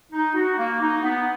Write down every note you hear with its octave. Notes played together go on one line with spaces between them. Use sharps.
D#4
F#4
A#3
D#4
B3